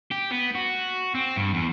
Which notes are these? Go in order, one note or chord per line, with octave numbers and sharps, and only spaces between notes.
G4
B3
F#4
C4
G2
E2